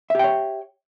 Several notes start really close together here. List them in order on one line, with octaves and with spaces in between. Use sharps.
E5 G4 G5 C#5